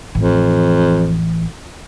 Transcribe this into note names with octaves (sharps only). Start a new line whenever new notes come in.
A1 F2 E3